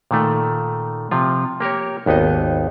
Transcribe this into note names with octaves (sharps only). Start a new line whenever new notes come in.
A#2 D#3 A3
C3 F3 F4
A#3 G4 A#4 C#5
G#1 D#2 B3 D#4 D#5